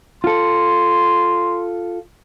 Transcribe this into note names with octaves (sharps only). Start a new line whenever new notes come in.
F4 A4 C6